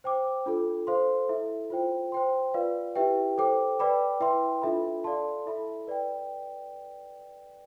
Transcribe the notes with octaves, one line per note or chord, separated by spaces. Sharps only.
C5 G5 D6
D4 F4 A4
A4 C5 F5 C6
E4 A4 E5
F4 C5 G5
C5 G5 C6
F4 B4 D5 F5
E4 G4 B4 E5 G5
A4 C5 G5 D6
B4 D5 G5 B5 D6
E4 B4 E5 G5 C6
D4 F4 A4 E5 B5
A4 D5 F5 A5 C6
E4 A4 E5 B5
B4 D5 G5